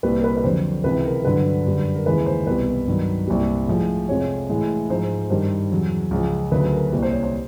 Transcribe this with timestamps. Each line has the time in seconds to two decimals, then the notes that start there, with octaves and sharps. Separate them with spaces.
0.03 C2 A#2 G3 B4
0.18 A#4
0.24 B4
0.37 B4
0.44 F2 D3 F#3 C5
0.84 C#2 C3 E3 B4
1.05 A#4
1.25 G2 D3 F#3 B4
1.66 F#2 D3 G3
1.95 A#4
2.06 D#2 C#3 E3 G#3 B4
2.26 C5
2.47 C2 B2 G3 B4
2.87 G2 D#3 F#3
3.28 C2 A#2 G3
3.68 A2 F3 G#3
4.09 F2 C3 F3 G#3 C#5
4.49 A2 E3 G#3
4.90 G#2 F3 G#3 C5
5.30 G2 D#3 G3 C5
5.71 E2 C#3 F#3
6.11 C#2 C#3 F3
6.52 D2 C#3 F#3 B4
6.73 A#4
6.93 C2 A#2 G3
7.03 C5
7.13 C#5
7.23 C5